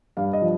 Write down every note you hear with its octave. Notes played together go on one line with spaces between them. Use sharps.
G2 F5
D#5
F3